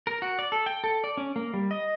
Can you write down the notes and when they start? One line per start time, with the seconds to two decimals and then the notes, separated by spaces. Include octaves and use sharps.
0.07 A#4
0.22 F#4
0.39 D5
0.52 A4
0.66 G5
0.84 A4
1.04 D5
1.17 C#4
1.36 A#3
1.54 G3
1.71 D#5